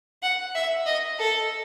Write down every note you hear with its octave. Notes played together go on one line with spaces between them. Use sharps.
F#5
E5
D#5
A4